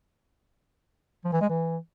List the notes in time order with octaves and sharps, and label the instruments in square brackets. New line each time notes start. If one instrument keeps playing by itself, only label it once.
[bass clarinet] F3
E3
G#3
E3